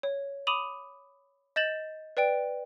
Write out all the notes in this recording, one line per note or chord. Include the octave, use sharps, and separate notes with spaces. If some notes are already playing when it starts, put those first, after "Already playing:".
C#5
B5 D6 D#6 D#7 F7 F#7
D#5 G6 A6 E7 F#7
B4 D5 G5 D7